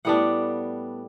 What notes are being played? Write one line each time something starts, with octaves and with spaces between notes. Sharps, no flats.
A2 G3 B3 D4 F#5